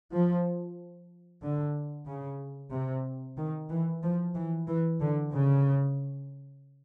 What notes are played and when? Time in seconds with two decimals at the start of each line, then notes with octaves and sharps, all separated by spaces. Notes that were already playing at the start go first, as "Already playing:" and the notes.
0.13 F3
1.42 D3
2.07 C#3
2.72 C3
3.37 D#3
3.70 E3
4.03 F3
4.35 E3
4.68 E3
5.00 D3
5.32 C#3